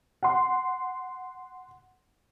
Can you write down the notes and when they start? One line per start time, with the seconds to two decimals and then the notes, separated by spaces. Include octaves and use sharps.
0.23 F#5 C6